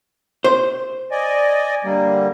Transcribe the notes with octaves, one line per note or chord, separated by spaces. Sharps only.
C5
D5 D#5 G#5
D3 G3 A#3